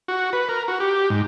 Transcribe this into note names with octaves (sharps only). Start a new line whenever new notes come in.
F#4
B4
A#4
F#4
G4
G#2